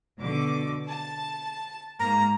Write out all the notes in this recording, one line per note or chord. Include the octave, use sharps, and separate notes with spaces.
B2 D3 D6
A5
G#2 A#3 A#5